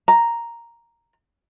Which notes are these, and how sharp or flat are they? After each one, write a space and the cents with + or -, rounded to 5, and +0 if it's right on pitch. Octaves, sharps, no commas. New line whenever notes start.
A#5 +0